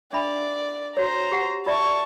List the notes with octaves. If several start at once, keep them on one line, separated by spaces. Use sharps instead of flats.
D4 D5 E5 B5
F#4 C5 C#5 A#5
G4 F#5
F4 D5 E5 A5 C#6